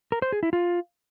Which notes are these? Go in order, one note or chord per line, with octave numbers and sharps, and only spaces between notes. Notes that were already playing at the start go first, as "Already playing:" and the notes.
A#4
C5
G#4
E4
F4